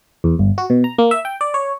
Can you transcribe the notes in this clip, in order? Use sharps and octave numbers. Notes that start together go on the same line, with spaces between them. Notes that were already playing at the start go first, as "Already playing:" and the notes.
E2
G1
F#4
B2
A#5
A#3
E5
G5
D5
C#5